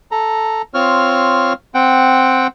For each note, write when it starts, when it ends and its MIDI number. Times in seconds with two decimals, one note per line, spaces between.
0.11 0.62 69
0.11 0.62 82
0.74 1.53 60
0.74 1.53 65
0.74 1.53 73
0.74 1.53 89
1.75 2.47 60
1.75 2.47 78
1.75 2.47 79